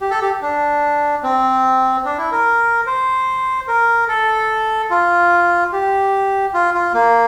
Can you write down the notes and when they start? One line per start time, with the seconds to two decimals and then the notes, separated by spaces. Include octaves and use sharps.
0.01 G4
0.11 A4
0.21 G4
0.42 D4
1.23 C4
2.05 D4
2.18 E4
2.32 A#4
2.87 C5
3.68 A#4
4.08 A4
4.90 F4
5.72 G4
6.54 F4
6.74 F4
6.94 A#3